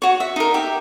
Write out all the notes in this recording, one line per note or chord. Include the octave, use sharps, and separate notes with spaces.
F#4 C#5
E5
D#4 A#4
G4 E5